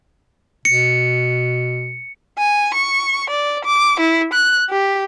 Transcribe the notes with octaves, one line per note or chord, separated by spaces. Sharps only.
B2 C#7
G#5
C#6
D5
D6
E4
F#6
G4